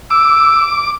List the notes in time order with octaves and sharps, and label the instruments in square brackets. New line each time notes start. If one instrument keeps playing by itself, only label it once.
[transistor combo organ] D6 [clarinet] E6